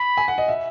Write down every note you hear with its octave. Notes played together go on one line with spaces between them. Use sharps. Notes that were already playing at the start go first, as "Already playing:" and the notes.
Already playing: B5
G#5
F#5
D#5
E5